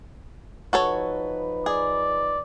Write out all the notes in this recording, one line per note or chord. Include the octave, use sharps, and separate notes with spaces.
F3 D#4 F#4 A4 B4 C#5
G#4 D5